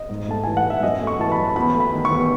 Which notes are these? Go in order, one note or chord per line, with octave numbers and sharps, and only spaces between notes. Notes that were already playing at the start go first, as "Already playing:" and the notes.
Already playing: D#5
G#2
A3 A5
E3 G#5
F#5
G#2
E5
F#2 D#5
A3
C#6
E3 A5
B5
F#2
E2 B5
A3
B5
D#3
C#6
E2